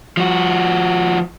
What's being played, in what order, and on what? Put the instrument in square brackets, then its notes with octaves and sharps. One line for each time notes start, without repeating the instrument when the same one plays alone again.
[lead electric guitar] F3 F#4